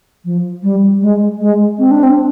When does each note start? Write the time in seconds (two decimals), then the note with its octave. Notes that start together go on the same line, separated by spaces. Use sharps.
0.25 F3
0.63 G3
1.02 G#3
1.40 G#3
1.79 C4
1.91 D4
2.03 C4